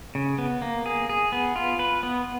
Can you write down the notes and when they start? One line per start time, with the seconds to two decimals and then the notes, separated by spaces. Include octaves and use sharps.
0.15 C#3
0.38 B3
0.62 A#3
0.86 G#4
1.09 G#4
1.32 B3
1.56 F4
1.79 B4
2.03 B3